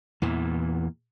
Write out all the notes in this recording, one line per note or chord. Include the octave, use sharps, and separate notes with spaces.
E2 A#2 E3